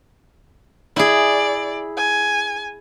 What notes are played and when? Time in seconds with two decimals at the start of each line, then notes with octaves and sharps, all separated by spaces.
0.96 E4 G#4 D5
1.97 G#5